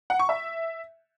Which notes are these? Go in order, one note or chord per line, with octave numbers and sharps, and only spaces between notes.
F#5
C#6
E5